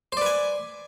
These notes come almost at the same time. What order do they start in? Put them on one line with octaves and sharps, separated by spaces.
C5 D5 B4 G#5